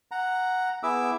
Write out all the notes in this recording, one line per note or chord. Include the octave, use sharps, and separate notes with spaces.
F#5 A#5
B3 E4 G#4 E5 D6 E6